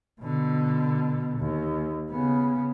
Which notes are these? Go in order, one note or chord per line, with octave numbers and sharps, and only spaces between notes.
B2 D3
D#2
C#3 B3